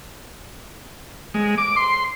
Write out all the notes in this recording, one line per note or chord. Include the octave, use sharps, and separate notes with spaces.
G#3
D6
C6